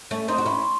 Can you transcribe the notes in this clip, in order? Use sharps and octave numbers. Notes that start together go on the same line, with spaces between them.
A3 C#4
C4 D#4 C6
F#4
C#4 E4 C#6
C6